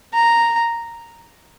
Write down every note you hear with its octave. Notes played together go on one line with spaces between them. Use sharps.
A#5